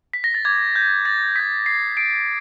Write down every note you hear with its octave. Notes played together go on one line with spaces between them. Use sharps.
B6
A#6
A6
D6 G6 G#6
G6
A6
D#6 G6 B6
C7
C7 D7